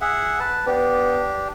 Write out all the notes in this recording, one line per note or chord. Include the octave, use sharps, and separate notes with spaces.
G#4 E5 F#5
B4 A5
B3 D4 G4